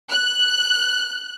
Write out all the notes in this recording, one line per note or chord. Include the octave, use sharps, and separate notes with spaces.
F#6